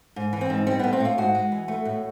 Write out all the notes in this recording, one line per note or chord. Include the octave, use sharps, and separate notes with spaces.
G#2
E3
C4
G#2
G3 C4
A2 B3
C4
A2 F4
G#2 F#4
G#3
E3
A3
A2